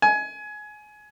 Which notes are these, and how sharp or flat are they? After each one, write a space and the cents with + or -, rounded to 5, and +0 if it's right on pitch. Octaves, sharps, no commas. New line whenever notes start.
G#5 +20